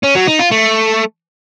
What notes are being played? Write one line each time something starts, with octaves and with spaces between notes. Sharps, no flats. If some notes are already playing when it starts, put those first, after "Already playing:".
C#4
F#3
D#4
F4
A3